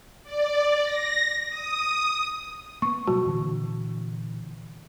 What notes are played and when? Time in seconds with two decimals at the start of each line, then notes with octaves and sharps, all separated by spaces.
0.23 D5
0.82 A#6
1.49 D#6
2.82 A#3 B3 C#6
3.07 B2 F#3 G3 F#4
3.26 A#2 D3 E3